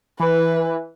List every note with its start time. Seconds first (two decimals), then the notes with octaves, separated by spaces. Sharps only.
0.20 E3 B4